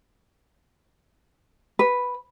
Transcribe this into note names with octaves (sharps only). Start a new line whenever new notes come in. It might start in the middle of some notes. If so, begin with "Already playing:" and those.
B4